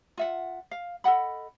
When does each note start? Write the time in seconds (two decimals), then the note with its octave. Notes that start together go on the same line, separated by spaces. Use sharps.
0.18 F4 E5 F#5
0.71 F5
1.04 A4 D#5 F#5 B5